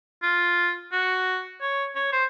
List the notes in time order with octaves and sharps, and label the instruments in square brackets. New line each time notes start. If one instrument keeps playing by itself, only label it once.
[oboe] F4
F#4
C#5
C#5
C5